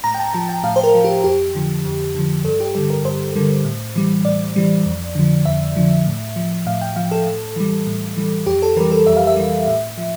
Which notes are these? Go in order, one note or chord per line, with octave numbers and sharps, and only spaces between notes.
A2 A#5
G5
A5
F3 A5
G5
A2 F5
C5
A#4
F3
G4
F2 G4
D3 F3
F2
D3 F3
G2 A4
G4
D3 G3 A4
A#4
G2 C5
D3 G3
A2
E3 G3
A2 D5
E3 G3
F2
D3 F3
F2 E5
D3 F3
A2
F3
A2 F5
G5
F3 F5
A4
A2
E3 G3
A2
E3 G3
F2 G4
A4
E3 G3 A#4
A4
F2 E5
F5
E5
E3 G3
A2
F3